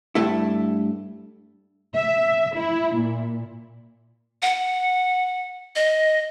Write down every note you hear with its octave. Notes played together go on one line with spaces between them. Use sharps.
G2 A3 E4
E5
E4
A#2
F#5
D#5